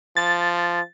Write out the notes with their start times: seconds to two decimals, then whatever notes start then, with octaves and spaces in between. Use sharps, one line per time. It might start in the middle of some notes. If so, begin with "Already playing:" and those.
0.17 F3 A6